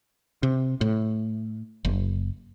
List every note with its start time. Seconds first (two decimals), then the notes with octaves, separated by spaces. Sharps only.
0.43 C3
0.81 A2
1.85 F#1